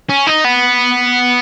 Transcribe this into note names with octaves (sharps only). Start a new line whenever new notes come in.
C#4
D#4
B3